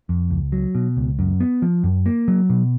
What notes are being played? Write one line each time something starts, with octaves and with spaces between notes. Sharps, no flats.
F2
C#2
F#3
B2
C#2
F#2
B3
F3
F#2
A#3
F#3
B2